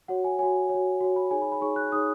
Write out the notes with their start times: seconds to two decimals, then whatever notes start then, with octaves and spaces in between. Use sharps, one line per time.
0.08 F#4 C#5 F#5
0.24 G#5
0.39 F#4 C#5 G#5
0.69 F#4 C#5
1.01 F#4 C#5
1.16 B5
1.31 D#4 G#4 C#5 G#5
1.42 B5
1.52 B5
1.61 D#4 G#4 C#5 C#6
1.76 F#6
1.92 D#4 G#4 C#5 D#6